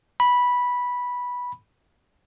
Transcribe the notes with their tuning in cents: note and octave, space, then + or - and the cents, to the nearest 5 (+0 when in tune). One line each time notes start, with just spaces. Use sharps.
B5 -10